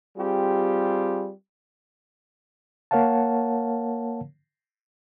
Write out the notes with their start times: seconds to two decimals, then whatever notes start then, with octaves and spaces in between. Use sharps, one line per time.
0.18 G3 C4 F4 G4 G#4
2.91 A#3 A#4 C#5 F5 F#5 A5